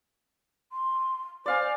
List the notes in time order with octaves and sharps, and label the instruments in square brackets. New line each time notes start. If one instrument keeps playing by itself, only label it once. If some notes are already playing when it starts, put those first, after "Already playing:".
[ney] C6
[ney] C5 [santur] D5 F5 G#5